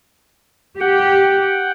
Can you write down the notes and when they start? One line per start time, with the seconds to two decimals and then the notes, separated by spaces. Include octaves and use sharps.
0.80 G4 F#5 G5